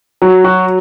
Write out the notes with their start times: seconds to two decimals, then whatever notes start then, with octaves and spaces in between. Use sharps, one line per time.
0.22 F#3
0.44 F#4